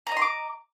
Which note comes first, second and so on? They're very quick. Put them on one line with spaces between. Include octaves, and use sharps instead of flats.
A#5 D#5 C6 D6